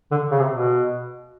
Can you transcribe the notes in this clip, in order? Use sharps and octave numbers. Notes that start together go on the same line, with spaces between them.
D3
C#3
C3
B2